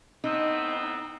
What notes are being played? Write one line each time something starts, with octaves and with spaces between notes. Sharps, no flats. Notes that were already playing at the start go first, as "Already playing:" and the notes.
A2 B3 C4 D#4